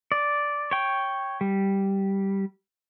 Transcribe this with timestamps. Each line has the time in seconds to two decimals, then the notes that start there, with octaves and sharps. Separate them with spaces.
0.12 D5
0.71 C#5 G5
1.41 G3